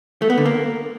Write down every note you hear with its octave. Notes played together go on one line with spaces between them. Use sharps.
A3
B3
D3
A#3